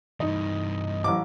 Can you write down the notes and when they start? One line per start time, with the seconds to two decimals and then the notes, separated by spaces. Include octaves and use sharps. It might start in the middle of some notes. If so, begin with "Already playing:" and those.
0.20 G2 E3 D#4 D#5
1.04 A1 D6